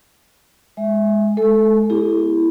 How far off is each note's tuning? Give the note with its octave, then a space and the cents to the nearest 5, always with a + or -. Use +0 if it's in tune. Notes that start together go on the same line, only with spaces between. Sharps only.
G#3 +0 E5 +0
G#3 +35 A4 -5
B3 +0 E4 +0 G4 +35